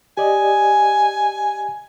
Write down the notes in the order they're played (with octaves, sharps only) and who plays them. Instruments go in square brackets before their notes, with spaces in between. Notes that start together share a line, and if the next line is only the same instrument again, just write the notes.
[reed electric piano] G4 D5 D#5 [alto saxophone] G#5